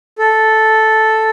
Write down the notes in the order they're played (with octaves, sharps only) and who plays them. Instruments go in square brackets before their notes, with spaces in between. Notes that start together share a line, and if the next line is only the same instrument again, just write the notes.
[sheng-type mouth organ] A4